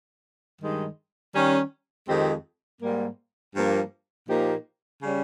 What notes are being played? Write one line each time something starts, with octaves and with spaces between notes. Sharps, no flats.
G2 D#3 G#3 D#4
D#3 G3 C#4
F2 D#3 G#3 C4 G4
G#2 G3 A#3
G2 F3 A#3
A#2 F3 A#3 D#4 G4
C#3 G3 C#4